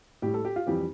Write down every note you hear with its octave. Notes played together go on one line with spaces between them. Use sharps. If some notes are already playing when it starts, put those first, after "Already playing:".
A2 G3 G4
A4
G4
F4
F2 E3 G3 G4